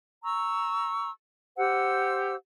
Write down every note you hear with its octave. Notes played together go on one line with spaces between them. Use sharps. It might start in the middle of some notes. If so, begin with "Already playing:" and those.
A#5 C#6 E6
G4 C5 F#5 E6